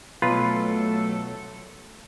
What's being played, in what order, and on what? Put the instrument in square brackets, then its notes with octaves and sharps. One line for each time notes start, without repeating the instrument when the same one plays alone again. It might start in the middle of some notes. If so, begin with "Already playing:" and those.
[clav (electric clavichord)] B1 F4 B4 [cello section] F#3 A3 A4